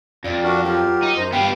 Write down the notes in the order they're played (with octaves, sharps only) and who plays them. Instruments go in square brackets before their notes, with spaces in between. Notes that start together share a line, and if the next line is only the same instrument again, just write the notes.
[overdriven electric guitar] F2 [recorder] D5
[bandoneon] D4 F#4 A#4
[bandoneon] F#3 G4 A#4 [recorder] F4
[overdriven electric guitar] D#4
[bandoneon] F#2 C5
[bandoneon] G2 F5 [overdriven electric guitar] B3 G4 [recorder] G5